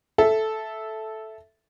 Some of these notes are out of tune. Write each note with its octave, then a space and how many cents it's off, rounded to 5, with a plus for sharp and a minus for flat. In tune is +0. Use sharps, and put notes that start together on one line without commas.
A4 -10 E5 +0